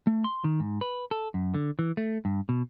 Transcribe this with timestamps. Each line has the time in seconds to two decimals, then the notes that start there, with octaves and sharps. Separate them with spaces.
0.07 A3
0.24 C6
0.44 D#3
0.60 G#2
0.81 B4
1.11 A4
1.34 F#2
1.54 D3
1.79 E3
1.97 A3
2.25 G2
2.49 B2